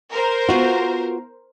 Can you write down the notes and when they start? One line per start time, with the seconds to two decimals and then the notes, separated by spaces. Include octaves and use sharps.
0.12 A#4 C5
0.49 B3 F4 F#4